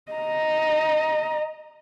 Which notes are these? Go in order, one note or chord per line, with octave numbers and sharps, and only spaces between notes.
D#5 A#5